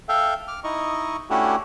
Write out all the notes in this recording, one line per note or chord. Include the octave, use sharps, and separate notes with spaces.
A4 E5 F5 G5
D6 F6
D#4 E4 D#5 C#6
A3 C#4 D4 E4 F#4 G4